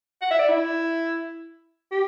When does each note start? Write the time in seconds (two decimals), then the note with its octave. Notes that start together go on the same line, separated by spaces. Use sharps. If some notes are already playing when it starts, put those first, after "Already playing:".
0.21 F#5
0.31 E5
0.39 D5
0.49 E4
1.92 G4